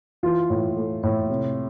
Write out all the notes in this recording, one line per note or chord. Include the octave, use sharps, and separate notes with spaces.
E3 F4
A2
A3
A2
C3